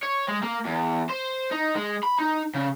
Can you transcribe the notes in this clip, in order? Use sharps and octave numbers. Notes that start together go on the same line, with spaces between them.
C#5
G#3
A#3
E2
C5
D#4
G#3
B5
D#4
C#3